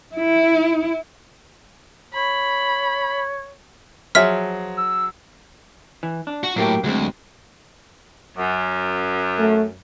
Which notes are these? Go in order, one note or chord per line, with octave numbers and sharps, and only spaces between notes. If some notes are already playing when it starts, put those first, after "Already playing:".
E4
C#5 B5
F3 F#3 G#4 E5 F6 B6
E6
E3
D4
F#4
A2 F#3 A#3 G4
D2 F#3 G#3 C4
F#2
A3